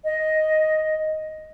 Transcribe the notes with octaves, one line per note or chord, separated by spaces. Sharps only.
D#5